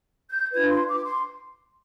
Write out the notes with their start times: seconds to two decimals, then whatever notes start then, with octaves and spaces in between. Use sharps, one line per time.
0.30 G6
0.53 D4 F4 B4 G#6
0.70 C6
0.89 D6
1.06 C6